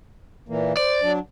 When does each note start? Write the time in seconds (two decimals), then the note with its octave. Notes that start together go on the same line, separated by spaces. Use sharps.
0.49 A#2 E3 A#3
0.77 C5 D5
1.02 F#3 D4